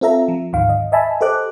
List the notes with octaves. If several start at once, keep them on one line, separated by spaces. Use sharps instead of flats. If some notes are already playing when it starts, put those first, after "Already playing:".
C4 F4 A4 E5 A#5
F3
D2 G#2 D#3 F5
D#5
D#5 E5 G#5 A5 B5 E6
G4 A4 C5 D#5 D6 F#6